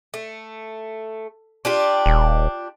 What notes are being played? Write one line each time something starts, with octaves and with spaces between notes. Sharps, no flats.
A3
D4 F4 G4
D#1